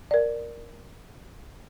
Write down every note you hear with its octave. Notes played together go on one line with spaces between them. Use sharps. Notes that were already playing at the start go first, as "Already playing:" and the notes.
A#4 D5